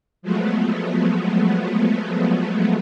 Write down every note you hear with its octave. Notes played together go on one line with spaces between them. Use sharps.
F3 F#3 G#3 A3 B3